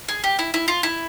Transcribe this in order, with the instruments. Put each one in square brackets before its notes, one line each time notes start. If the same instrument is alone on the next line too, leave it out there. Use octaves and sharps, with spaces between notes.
[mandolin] G#4
G4
E4
E4
F4
E4